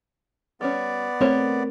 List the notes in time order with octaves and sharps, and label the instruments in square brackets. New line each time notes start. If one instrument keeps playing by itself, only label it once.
[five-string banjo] G3 C#4 [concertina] B3 D5
[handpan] A3 C4 [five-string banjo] A#4 C5 C#5